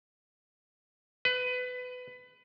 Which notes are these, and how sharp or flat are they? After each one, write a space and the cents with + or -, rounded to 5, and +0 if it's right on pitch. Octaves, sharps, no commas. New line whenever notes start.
B4 +20